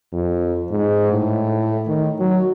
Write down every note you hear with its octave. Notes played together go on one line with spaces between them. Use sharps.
F2
G#2
A2
D#3
F#3